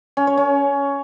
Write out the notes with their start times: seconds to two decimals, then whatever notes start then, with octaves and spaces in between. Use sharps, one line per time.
0.17 C#4
0.27 C#5
0.37 C#4